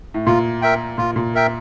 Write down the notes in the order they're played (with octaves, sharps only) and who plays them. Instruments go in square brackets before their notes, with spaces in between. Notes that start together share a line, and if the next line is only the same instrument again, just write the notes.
[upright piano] A2
[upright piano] A#2 [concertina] F4
[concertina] A#4 E5 G5
[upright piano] A#2 [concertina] F4
[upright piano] A#2
[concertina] A#4 E5 G5